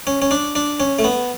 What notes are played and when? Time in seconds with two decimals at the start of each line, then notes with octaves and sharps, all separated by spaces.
0.07 C#4
0.22 C#4
0.31 D4
0.55 D4
0.80 C#4
0.99 A3
1.04 B3